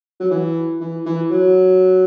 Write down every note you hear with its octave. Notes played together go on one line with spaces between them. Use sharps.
F#3
E3
E3
E3
F#3